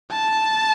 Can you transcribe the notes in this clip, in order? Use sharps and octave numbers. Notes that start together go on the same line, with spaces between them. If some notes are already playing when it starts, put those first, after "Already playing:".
A5